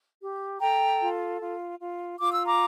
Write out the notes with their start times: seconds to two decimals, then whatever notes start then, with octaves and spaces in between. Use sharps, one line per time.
0.22 G4
0.61 A4 G5 A#5
1.00 F4
1.40 F4
1.79 F4
2.19 F4 D6
2.33 E6
2.45 A#5 D6